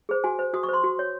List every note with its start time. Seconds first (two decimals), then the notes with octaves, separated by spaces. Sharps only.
0.09 G#4 C5
0.24 F#4 G#5
0.39 C5
0.54 F#4 D#6
0.63 C#6
0.69 C5 C6
0.84 F#4
0.99 C#5